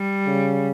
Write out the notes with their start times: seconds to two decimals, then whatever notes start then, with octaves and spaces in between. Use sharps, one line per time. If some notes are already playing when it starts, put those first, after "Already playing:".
Already playing: G3
0.27 C#3